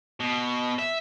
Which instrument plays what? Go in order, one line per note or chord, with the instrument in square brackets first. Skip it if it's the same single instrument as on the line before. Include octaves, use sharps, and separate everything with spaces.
[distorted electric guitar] B2
E5